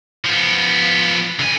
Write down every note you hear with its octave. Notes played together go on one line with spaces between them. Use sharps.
F3 B3
D3 G#5